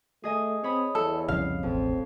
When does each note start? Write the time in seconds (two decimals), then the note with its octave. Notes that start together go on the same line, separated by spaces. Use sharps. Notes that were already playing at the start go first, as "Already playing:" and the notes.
0.24 A3 G#4 D#5 G#5
0.63 C4 C#5 B5 D#6
0.95 E2 A4
1.28 C2 F2 C#3 F5
1.63 E1 A1 F2 C4